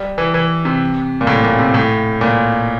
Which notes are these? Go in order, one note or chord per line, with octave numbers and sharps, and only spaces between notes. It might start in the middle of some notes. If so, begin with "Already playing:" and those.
Already playing: G3
E3
E3
C3
A#2
A2
A#2
C3
A2
A#2